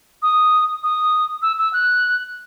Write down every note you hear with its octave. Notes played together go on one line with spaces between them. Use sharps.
D#6
D#6
E6
E6
F#6